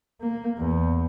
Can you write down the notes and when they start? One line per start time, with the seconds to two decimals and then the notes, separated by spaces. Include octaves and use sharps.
0.21 A#3
0.59 E2